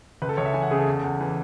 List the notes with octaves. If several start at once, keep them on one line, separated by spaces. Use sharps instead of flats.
C#2 B4
A4
C#2 C#5
E5
E3 G#5
F#5
C#3 G#4
A4
E2
E2
E3